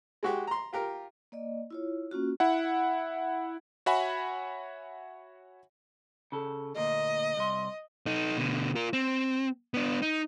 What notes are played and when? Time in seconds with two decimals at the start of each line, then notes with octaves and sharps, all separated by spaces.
0.23 G#3 F#4 G4
0.47 A#5 C6
0.73 F4 G4 A#4
1.32 A#3 D5 D#5
1.71 E4 F4 C#5
2.11 A#3 C#4 F4 F#4
2.40 E4 F#5
3.86 F#4 C#5 E5 F#5 G#5 B5
6.32 C#3 A4
6.76 D2 A#2 A#3 D#5
7.37 C2 C6
8.06 D#4 A4
8.37 B2 D3
8.76 F4 A#4
8.93 C4
9.74 B3 D4
10.02 D#4